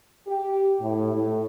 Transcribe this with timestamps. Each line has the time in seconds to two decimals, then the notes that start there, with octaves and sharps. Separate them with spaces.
0.27 G4
0.81 A2
1.14 A2 A3